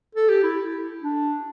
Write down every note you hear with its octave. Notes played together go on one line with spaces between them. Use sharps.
A4
G4
E4
D4